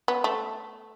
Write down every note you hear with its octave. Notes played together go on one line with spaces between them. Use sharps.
B3
A3